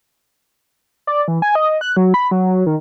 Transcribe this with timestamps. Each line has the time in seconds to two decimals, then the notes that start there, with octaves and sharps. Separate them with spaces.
1.07 D5
1.28 E3
1.42 G#5
1.55 D#5
1.81 F#6
1.96 F#3
2.14 B5
2.31 F#3
2.66 D#3